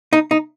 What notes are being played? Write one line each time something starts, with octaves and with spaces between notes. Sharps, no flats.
D#4
D#4